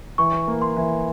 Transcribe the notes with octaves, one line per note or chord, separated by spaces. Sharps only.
E3 C#6
A#3
C6
E3